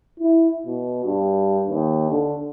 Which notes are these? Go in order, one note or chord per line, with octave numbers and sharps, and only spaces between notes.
E4
B2
G2
D#2
D3